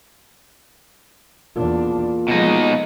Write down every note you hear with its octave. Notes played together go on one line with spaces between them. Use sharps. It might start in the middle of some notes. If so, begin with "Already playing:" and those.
E2 A#2 D4
B2 F3 G#3 D#4